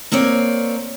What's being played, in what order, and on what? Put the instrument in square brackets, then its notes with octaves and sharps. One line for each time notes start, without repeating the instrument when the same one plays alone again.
[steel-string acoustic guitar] A#3 C4 C#5 D5